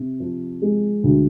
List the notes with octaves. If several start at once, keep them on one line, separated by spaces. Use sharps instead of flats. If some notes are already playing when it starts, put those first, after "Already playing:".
Already playing: C3
F3
G#3
D2